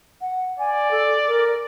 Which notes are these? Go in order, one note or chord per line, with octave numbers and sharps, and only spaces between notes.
F#5
D5 G#5
A4
A#4